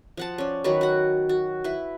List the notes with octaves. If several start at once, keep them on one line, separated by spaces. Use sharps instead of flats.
F3 F#5 A5
C#4 D5
D#3 F#3 F#4 B4
F#4 F#5
F#4
E4 B4